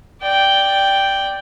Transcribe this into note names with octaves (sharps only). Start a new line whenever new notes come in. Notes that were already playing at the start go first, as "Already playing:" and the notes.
D5 G5